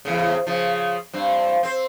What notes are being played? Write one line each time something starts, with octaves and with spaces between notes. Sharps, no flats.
E2 A2 C#3
C#3 F3
G2 C4
C4 C5